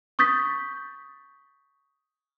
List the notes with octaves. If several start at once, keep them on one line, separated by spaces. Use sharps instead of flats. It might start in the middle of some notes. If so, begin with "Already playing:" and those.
C#6 D#6 G6 A6 B6